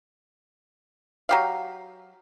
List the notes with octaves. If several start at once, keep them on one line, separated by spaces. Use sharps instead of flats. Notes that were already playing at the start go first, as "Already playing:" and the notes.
F#3 G4 F5